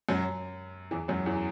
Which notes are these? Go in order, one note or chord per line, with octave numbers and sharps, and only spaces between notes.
F#2 F#3
E2 E3
F#2 F#3
E2 E3